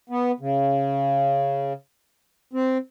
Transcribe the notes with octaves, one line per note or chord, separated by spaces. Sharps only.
B3
C#3
C4